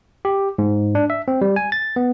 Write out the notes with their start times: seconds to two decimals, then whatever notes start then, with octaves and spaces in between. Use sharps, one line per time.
0.25 G4
0.58 G#2
0.95 D4
1.10 E5
1.28 C4
1.41 G3
1.56 G#5
1.72 A6
1.96 B3